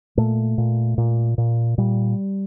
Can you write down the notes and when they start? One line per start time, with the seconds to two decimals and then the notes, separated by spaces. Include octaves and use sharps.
0.17 A#2 A3
0.58 A#2
0.98 A#2
1.38 A#2
1.78 A#2 G3